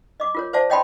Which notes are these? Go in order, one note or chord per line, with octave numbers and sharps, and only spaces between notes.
D#5 D6
F4 A#4 C#5
C5 D5 F5 A5
C#5 D#5 G5 A5 B5 C6